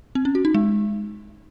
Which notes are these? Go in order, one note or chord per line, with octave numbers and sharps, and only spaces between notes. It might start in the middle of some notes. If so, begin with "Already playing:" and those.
C4
C#4
F#4
D#4
G#3